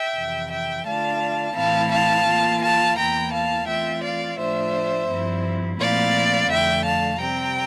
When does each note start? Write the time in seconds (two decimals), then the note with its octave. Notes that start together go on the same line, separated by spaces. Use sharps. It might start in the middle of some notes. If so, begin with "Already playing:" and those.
Already playing: E5 G5
0.15 F2 C3 E3
0.50 E5 G5
0.86 D3 A3 D4 F4 F5 A5
1.55 A2 E3 A3 C4 E4 F5 A5
1.91 F5 A5
2.26 E3 A#3 F4
2.61 F5 A5
2.96 E2 E3 A#3 E4 G5 A#5
3.32 F5 A5
3.67 E3 A3 C4 F4 E5 G5
4.03 D5 F5
4.38 A2 F3 A3 D4 F4 C5 E5
5.08 G2 F3 C4 E4
5.79 A#2 F3 A3 C4 E4 D5 F5
6.49 F2 D3 A3 E5 G5
6.84 F5 A5
7.20 C3 G3 C4 G5 A#5